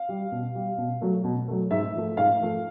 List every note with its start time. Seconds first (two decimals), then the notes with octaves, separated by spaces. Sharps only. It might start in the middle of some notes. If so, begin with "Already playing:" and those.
Already playing: F5
0.09 G3
0.32 B2
0.55 G3
0.78 B2
1.01 F#3 A3
1.24 B2
1.48 F#3 A3
1.71 G#2 E5
1.95 F3 A3
2.17 G#2 F5
2.41 F3 A3